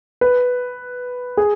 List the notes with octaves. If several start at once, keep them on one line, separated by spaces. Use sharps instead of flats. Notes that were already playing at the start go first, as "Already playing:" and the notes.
B4
G#4